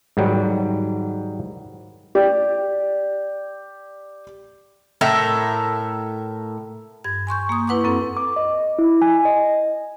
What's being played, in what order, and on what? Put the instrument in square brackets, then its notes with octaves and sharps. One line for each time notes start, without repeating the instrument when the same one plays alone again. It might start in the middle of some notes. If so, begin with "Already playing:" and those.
[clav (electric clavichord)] G#2 D#3 F#3 G3
[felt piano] G4 D5
[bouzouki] A2 A4 A#4 E5
[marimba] G2 G#6
G#5 C6 C#6 G6
A#3 D#6
E4 B4 F#5 C#6 D6
F#2 C4 A4
[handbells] D6
D#5
E4
G#5
D#5